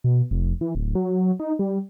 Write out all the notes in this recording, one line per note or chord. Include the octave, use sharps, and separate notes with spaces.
B2
F1
E3
D1
F#3
D#4
G3